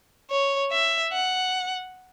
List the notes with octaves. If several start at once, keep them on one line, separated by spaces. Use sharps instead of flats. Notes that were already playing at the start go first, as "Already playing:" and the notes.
C#5
E5
F#5